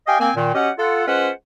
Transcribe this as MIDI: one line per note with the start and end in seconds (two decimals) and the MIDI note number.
0.07 0.17 67
0.07 0.17 75
0.07 0.17 77
0.07 0.17 79
0.07 0.17 80
0.20 0.30 58
0.20 0.30 60
0.20 0.30 80
0.35 0.50 46
0.35 0.50 51
0.55 0.70 54
0.55 0.70 61
0.55 0.70 67
0.55 0.70 75
0.55 0.70 78
0.78 1.06 65
0.78 1.06 69
0.78 1.06 78
1.06 1.29 56
1.06 1.29 61
1.06 1.29 65
1.06 1.29 71
1.06 1.29 72
1.06 1.29 78